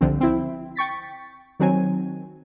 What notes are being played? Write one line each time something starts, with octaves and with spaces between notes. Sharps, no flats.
C2 D3 F3 C4
C4 E4
G5 C#6 A6 B6
D#3 F#3 C4 G#5